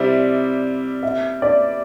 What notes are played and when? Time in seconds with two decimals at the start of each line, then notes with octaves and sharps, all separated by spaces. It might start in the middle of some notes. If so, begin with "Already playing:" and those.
Already playing: C3 G3 C4 E4 D5
1.03 E5
1.42 D5